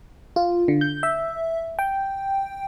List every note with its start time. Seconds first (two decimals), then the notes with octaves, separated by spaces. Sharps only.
0.36 F4
0.68 D3
0.81 G6
1.03 E5
1.79 G5